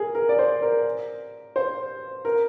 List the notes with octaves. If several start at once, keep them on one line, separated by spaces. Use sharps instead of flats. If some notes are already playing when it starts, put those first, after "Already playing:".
Already playing: G#4 A#4
A#4
D5
C5
A#4
C5
A#4